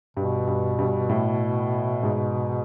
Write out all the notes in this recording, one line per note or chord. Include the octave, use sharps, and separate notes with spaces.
G2 B2
G2
G2
A2
G#2